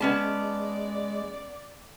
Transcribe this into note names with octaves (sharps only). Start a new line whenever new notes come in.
G#3 B3 C#4 D5 A5